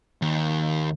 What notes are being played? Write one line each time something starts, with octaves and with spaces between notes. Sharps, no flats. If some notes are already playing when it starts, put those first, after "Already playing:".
D#2